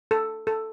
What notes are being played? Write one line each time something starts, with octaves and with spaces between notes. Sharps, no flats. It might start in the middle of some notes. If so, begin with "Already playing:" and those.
A4
A4